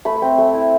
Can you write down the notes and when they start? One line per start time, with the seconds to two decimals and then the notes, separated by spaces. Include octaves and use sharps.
0.05 A3 B5
0.22 C4
0.38 A3
0.54 E4